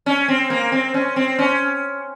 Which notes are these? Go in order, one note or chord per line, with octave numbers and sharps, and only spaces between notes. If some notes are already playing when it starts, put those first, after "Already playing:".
C#4
C4
A#3
C4
C#4
C4
C#4